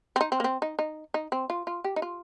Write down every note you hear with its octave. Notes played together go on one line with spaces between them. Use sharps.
C4
D#4
C4
A#3
C4
D#4
D#4
D#4
C4
F4
F4
G4
D#4
F4